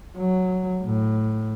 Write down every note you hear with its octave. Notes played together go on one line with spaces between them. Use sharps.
F#3
A2